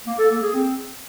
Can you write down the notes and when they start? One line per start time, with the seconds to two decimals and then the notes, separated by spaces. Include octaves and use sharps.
0.07 A#3
0.19 A4
0.31 A#3
0.42 G#4
0.54 C4